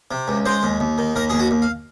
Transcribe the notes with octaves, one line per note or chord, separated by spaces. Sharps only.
C3
C#2
G#3 C5
D#2
D#2
D#3
D#2 A#4
D#2 G#4
F#4
D#2
F5